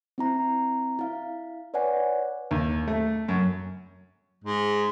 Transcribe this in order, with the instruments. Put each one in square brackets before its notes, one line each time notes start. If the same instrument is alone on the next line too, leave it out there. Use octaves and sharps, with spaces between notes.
[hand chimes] C4 E4 A#5
E4 F5
B4 C#5 D5 F#5 G#5
[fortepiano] D#2
A3
F#2
[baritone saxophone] G#2